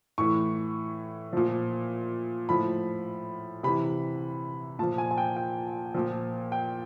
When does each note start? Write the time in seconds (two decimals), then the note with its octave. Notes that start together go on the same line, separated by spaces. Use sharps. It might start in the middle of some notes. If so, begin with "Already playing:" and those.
0.18 A2 E3 C#6
1.33 A#2 F3
2.49 A2 F3 B5
3.63 C3 E3 B5
4.79 A#2 F3 A5
4.98 G#5
5.11 G#5
5.18 G5
5.37 G5
5.95 A#2 F3
6.52 G5